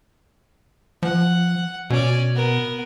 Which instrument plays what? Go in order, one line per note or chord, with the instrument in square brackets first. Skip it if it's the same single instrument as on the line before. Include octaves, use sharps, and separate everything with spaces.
[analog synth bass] F3 [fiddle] F#5
[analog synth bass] B2 [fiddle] C#4 D5
[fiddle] B3 A#4